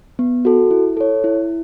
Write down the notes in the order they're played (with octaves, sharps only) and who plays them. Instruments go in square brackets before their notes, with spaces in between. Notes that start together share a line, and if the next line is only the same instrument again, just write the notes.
[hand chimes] B3
F#4 A4
E4
A4 C#5
E4